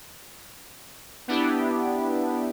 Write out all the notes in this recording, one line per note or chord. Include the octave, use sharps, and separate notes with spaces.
B3 D4 E4 G4